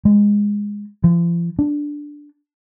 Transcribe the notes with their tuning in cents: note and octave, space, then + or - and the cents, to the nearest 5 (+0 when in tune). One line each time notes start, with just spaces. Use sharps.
G#3 -15
F3 -40
D4 +0